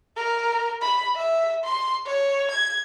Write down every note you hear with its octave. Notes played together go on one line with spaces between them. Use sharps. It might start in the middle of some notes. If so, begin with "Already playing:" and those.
A#4
B5
E5
C6
C#5
G#6